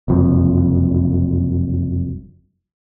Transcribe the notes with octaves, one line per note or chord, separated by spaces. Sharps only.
F#1 C2 F2